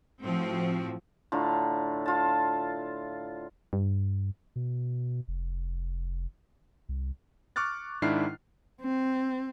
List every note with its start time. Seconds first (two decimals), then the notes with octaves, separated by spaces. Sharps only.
0.24 A2 F3 C4 F#4
1.32 A2 D3 F4 A#5
2.06 F4 A5
3.73 G2
4.56 B2
5.28 F1
6.89 C2
7.56 C#6 D6 F6 F#6 A6
8.02 G#2 D#3 D4 E4 F6 C7
8.81 C4